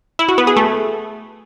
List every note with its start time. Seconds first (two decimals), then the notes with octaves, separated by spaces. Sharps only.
0.19 E4
0.28 F#4
0.38 B3
0.47 G#4
0.56 A3